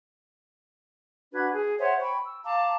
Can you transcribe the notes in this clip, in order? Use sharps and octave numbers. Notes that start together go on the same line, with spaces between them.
D4 F#4 B4 G#6
G#4
C5 C#5 E5 F#5
G5 B5 C#6
E6
F5 A5 A#5 D6